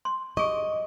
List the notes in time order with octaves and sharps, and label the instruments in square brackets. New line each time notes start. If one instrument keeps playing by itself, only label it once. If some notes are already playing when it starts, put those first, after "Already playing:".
[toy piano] C6
[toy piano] G4 G#4 C#6 [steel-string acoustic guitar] D#5